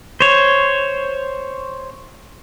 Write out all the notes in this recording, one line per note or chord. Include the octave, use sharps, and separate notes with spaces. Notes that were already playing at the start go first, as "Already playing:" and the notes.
C5 C#5